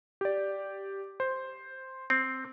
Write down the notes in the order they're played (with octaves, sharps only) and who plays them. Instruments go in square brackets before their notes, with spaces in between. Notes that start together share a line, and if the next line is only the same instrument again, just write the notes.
[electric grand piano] G4 D5
C5
[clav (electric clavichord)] C4